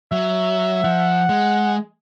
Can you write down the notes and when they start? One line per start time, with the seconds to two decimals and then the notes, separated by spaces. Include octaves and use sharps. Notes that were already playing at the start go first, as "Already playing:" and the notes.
0.12 F#3 E5
0.84 F3 F#5
1.29 G#3